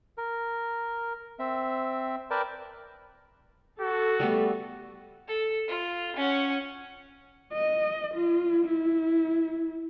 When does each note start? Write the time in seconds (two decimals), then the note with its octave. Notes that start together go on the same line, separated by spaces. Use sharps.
0.18 A#4
1.39 C4 E5
2.31 A#4 B4 D5 G5 A5
3.80 F#4 A4
4.20 G3 A3 B3
5.28 A4
5.68 F4
6.16 C#4 F#5
7.53 D#5
8.14 F4
8.65 E4